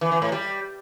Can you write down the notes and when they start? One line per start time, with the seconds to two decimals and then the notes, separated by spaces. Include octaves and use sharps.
0.01 E3
0.12 E3
0.22 A2
0.32 G3